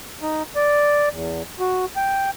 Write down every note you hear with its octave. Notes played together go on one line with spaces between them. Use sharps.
D#4
D5
E2
F#4
G5